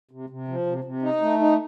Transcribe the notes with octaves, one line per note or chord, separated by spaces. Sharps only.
C3
C3
F3
C3
C3
D#4
A3
D#4